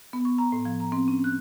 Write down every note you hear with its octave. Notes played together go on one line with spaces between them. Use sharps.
B3
C#6
A#5
A2
F3
A#5
C4
C#4
F#6